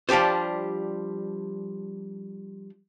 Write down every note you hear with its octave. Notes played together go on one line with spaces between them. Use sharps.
F3 G3 D4 G4 C5